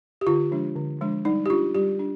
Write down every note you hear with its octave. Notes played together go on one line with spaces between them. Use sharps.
G4
D3 F4
F3 G#3 D4
D3
F3 G#3 D4
G3 D#4
G4
D4 F4
G3 G4
D4